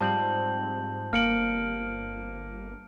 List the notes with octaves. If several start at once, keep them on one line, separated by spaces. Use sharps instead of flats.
G#2 F3 G3 C4 A5 G6 F#7
G1 A#3 F6 C#7 D7 F#7